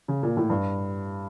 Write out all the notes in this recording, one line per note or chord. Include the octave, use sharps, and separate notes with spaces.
C#3
A#2
A2
G2